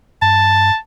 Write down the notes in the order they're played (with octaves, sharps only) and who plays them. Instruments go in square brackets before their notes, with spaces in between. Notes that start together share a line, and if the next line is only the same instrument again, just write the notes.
[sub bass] G2 [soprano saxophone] A5